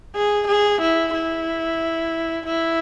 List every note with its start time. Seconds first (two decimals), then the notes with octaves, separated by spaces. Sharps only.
0.15 G#4
0.48 G#4
0.82 E4
1.14 E4
2.46 E4